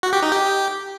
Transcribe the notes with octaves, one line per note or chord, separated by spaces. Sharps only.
F#4
G4
D#4
G4